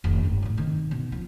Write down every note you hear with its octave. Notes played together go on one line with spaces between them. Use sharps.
F1 D#3
G1 G#2
A2 F#3
C3 D#3
B2
F3